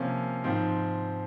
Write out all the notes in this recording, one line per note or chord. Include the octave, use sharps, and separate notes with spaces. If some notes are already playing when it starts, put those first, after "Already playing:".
Already playing: C3 F3 A#3 C#4 F5
G#2 F3 C4